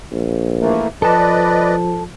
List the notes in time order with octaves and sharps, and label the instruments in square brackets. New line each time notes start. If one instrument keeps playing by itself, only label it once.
[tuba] A#1
[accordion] E3 A3 A#3
[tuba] F3 [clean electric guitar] A4 A5 [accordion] B4 D5 D#5